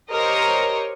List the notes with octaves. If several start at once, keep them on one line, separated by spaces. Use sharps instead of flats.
G4 A#4 C5 C#5 D#5